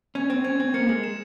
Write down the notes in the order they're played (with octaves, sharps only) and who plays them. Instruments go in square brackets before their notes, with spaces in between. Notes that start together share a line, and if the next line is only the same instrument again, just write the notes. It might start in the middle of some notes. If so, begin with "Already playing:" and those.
[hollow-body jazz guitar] C#4 [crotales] G#6
[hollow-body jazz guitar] C4
[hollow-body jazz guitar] C#4 [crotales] G#6
[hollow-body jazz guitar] C4
[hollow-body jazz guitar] A#3 [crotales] C#7
[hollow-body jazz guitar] G#3
[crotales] E7